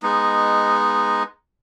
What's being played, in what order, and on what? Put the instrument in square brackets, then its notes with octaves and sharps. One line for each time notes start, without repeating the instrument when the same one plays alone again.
[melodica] G#3 B3 D#4